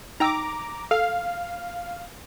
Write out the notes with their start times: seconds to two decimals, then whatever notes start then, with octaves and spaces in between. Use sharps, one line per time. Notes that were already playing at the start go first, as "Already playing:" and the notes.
0.20 D#4 G5 A#5 D6 E6
0.91 A4 F5